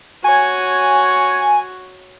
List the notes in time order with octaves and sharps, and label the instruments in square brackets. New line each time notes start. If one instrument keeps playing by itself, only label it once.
[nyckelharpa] F#4 C#5 [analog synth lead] G#5